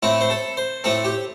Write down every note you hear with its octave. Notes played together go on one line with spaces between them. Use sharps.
A2 A3 C4 E4
C5
A4
C5
A2 A3 C4 A4
G4